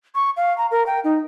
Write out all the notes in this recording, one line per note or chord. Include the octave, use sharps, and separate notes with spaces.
C#6
F5
A#5
A#4
G5
D#4